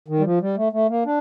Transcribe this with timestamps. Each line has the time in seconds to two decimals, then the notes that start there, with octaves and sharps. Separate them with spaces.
0.08 D#3
0.19 G3
0.24 F3
0.41 G3
0.57 A3
0.73 A3
0.89 A#3
1.05 D4